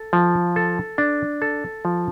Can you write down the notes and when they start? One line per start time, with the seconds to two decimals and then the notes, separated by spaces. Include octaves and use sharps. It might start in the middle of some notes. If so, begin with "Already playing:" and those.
Already playing: A4
0.13 F3
0.56 A4
0.98 D4
1.42 A4
1.85 F3